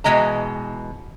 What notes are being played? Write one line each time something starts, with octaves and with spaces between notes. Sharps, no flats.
B2 E3 F#3 G#3 D#5 A#5